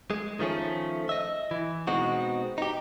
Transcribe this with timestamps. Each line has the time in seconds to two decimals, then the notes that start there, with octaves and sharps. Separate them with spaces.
0.10 G#3
0.39 D#3 F3 A3 C#4
1.09 D#5 E5
1.51 E3
1.87 B2 G#3 C4 D#4 F#4
2.58 D#4 G4